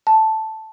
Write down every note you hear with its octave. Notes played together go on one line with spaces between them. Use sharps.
A5